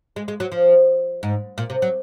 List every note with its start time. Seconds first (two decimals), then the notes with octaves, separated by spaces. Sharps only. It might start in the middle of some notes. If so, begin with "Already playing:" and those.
0.16 G#3
0.28 G#3
0.40 F#3
0.52 F3
1.23 G#2
1.58 A#2
1.70 C3
1.82 F#3